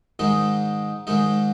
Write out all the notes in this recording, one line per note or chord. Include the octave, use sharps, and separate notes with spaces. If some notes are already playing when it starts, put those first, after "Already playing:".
G#2 D#3 G#3 D#4
G#2 D#3 G#3 D#4